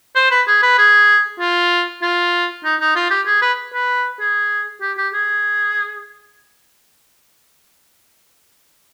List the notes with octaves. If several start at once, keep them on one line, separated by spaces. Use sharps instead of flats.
C5
B4
G#4
B4
G#4
F4
F4
D#4
D#4
F4
G4
G#4
B4
B4
G#4
G4
G4
G#4